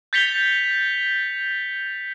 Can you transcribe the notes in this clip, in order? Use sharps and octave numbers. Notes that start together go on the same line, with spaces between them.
G6 A6 B6 C#7 F7 G7